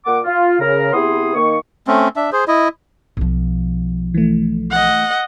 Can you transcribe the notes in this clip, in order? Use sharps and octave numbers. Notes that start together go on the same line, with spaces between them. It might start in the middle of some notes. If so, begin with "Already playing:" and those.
A#2 A#3 F#5 D6
F4
C#3 A#4
C3 B3 E4 G#4 C6 D#6
D#3 A#3 C#6
A3 C4 C#4
D4 E5
G#4 C5
E4 D#5
B1 F3
E3 A3
D#5 F#5